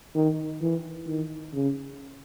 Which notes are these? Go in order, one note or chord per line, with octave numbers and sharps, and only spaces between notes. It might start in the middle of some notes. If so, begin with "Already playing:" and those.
D#3
E3
D#3
C#3